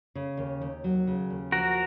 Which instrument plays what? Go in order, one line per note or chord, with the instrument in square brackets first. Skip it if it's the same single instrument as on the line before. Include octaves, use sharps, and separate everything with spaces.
[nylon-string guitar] C#3
D#2
D#2
F#3
C#3
D#2
[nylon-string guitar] F3 [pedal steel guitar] F#4 A#4